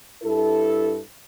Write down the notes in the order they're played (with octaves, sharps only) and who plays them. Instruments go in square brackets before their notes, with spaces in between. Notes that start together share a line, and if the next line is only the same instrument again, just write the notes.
[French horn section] G2 E4 A4